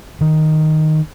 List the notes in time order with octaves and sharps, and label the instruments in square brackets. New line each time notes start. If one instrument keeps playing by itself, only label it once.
[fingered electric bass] D#3